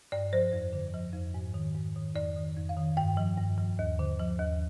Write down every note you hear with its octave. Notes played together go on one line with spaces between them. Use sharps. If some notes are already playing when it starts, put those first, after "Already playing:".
G2 D5
F3 C5
F2
D3
F3
F2
G#2
D#3
G#2
D#3
F2 D5
D#3
F2
F5
D#3
G2 G5
F3
G2
F3
D#2
D3
F3
D#2